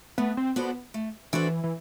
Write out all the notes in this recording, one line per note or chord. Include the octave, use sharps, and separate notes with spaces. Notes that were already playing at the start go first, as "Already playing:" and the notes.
A3 B3
C4
B3 D4 F#4 A4 C5
A3
E3 D4 F#4 A4 C5
E3